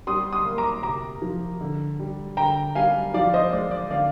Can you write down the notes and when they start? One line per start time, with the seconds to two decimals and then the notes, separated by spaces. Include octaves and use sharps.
0.07 G3 C6 D#6
0.33 C6 D#6
0.45 A#3
0.58 A#5 D6
0.83 C3 A#5 D6
1.22 F3
1.61 D3
2.00 G3
2.37 D3 G5 A#5
2.75 G3 F5 G#5
3.14 F3 D5 F5
3.34 C5 D#5
3.53 G#3 D5
3.71 D5
3.91 D3 D5 F5